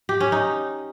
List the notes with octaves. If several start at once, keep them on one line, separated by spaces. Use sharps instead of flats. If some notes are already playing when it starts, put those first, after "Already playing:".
G4
C#4
D#4